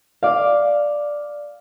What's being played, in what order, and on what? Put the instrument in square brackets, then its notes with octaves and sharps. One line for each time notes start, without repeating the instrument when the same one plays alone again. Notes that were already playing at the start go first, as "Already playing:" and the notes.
[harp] D5 F5